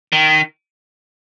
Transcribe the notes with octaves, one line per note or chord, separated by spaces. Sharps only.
D#3